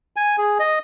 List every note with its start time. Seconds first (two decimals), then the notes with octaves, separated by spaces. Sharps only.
0.16 G#5
0.38 G#4
0.59 D#5